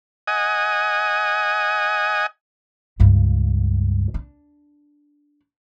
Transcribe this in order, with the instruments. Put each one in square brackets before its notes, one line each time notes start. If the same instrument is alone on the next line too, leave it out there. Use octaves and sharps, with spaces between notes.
[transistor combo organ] D#5 F#5 G#5 D#6
[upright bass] C#2 G2
D4